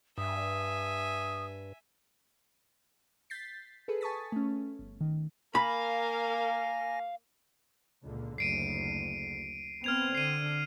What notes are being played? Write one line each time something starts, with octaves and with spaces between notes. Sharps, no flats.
G2 E5 G#5 D#6
G6 A6 B6 C7
G#4 A4 B4
G#5 A5 C#6 D#6 A6 B6
A3 C#4
G1
D#3
A#3 A#4 F5 G#5 B5 A#6
C#2 A#2 D3
F#1 D2 C7 D7 D#7
B3 C4 F6 G#6 F7
D3 C7 D#7